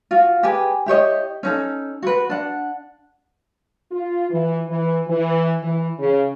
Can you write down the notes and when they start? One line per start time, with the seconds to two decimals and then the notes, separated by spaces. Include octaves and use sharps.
0.11 F4 F#4
0.43 G4 G#4 B4 G#5
0.86 E4 G4 C#5 D#5
1.43 C#4 D#4 A4
2.02 F#4 B4
2.30 D4 F#5
3.92 F4
4.30 E3
4.68 E3
5.08 E3
5.63 E3
5.99 C#3